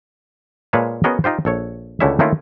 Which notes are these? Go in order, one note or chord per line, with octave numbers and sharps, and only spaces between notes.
A#2 G#3 B4 C#5 F5 A5
B3 C#4 F#4 G#4 A#4 D#5
D#4 F4 G4 C5
A#1 A4 C#5
C#2 D3 A3 C#4 E4 E5
D#3 A3 A#3 C#4 E4 F4